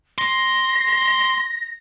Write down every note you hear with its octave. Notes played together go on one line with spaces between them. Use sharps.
C6 A#6